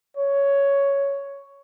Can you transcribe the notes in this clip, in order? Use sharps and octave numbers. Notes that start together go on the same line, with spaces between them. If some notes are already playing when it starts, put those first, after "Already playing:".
C#5